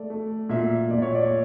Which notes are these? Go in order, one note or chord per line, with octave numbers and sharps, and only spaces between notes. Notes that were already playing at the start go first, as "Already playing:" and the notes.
Already playing: A3 D5
A3
A#2 E5
A#2 D5
C#5
D5